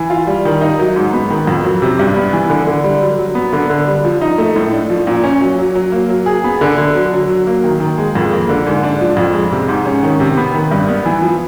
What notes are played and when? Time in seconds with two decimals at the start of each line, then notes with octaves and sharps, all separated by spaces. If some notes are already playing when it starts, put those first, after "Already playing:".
Already playing: E3
0.10 F4
0.27 G3
0.45 D#3
0.61 D#4
0.79 F#3
0.96 G#2
1.13 B3
1.30 D#3
1.47 F2
1.64 F#3
1.82 C3
1.99 G2
2.16 B3
2.33 E3
2.50 D3
2.67 D3
2.84 G3
3.02 F#3
3.19 F#3
3.35 B3
3.53 D3
3.70 D3
3.88 G3
4.05 F3
4.21 D#4
4.38 A3
4.56 A2
4.72 D4
4.90 F3
5.07 A#2
5.24 C#4
5.41 F#3
5.59 F#3
5.75 F#3
5.92 A#3
6.09 F#3
6.26 G#4
6.44 B3
6.61 D3
6.78 D3
6.95 F#3
7.12 F#3
7.29 F#3
7.47 A#3
7.64 D#3
7.80 D#3
7.98 G#3
8.15 F2
8.32 A#3
8.49 D3
8.67 G#2
8.83 D4
9.01 F3
9.17 F2
9.34 G#3
9.52 C3
9.68 G#2
9.86 C#4
10.03 D#3
10.20 C3
10.37 B3
10.55 D#3
10.71 G2
10.88 B3
11.06 E3
11.22 F3